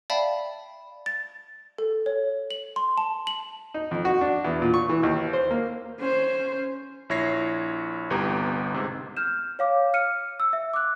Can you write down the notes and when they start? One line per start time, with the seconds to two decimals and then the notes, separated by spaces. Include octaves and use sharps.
0.10 D5 E5 F5 G5 A5 B5
1.06 A6
1.78 A4
2.06 C#5
2.51 F#7
2.76 C6
2.98 A5
3.27 F#7
3.74 D#4
3.91 F2
4.05 F#4
4.21 D4
4.45 E2
4.62 A#2
4.74 C#6
4.89 E3
5.03 D#2
5.33 C5
5.51 A#3
5.99 C#4 C5
7.09 A#1 E4 C#5 A#6 C7
8.10 G1 C2 B3 G4 A#5
8.74 G#2 C3
9.17 F6 G6 E7
9.59 C#5 F5 D6
9.94 F6 C#7 D#7
10.40 E6
10.53 E5
10.74 D6 F#6